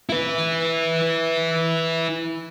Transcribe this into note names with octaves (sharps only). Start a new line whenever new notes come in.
E4 B4